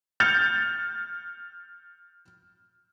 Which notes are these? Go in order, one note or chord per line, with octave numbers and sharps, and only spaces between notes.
F6 G6 A6 C#7 F7